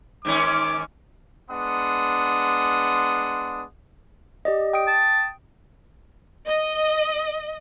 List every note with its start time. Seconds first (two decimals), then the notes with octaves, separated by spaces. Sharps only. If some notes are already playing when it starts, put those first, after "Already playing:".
0.25 G#2 D#3 C#4 D6
1.51 G#3 B3 D4 F#5 C6 D#6
4.45 G4 D5 D#5
4.73 G5 D#6 D7
4.88 A5
6.46 D#5